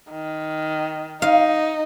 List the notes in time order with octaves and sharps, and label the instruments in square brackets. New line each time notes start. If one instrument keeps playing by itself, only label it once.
[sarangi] D#3
[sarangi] D#4 [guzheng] F5